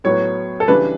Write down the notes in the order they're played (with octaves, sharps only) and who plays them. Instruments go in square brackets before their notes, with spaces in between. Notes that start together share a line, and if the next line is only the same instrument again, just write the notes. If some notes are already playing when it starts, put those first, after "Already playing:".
[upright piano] A2 F#3 B3 C#5
A4
C#3 E3 G3 D4 B4